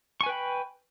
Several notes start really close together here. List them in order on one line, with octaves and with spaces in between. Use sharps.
C#6 G#5 B4 G5 B5